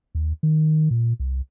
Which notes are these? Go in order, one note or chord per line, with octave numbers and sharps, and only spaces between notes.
D#2
D#3
A#2
C2